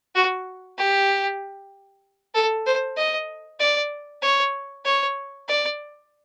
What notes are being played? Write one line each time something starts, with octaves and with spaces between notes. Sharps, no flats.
F#4
G4
A4
C5
D#5
D5
C#5
C#5
D5